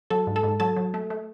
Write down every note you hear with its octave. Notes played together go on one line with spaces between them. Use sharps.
F#3 A4 A5
G#2
A4 A5
G#2
F#3 A4 A5
F#3
A3
A3